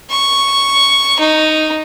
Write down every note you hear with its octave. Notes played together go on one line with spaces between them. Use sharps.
C#6
D#4